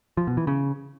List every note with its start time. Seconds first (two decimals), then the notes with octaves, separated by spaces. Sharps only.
0.17 F3
0.27 B2
0.37 E3
0.47 C#3